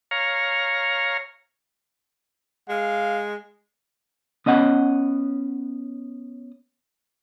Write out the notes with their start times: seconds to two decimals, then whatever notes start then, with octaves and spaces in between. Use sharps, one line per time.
0.11 C#5 F5 A#5
2.69 G#3 F5
4.46 B3 C#4 D#5 F#5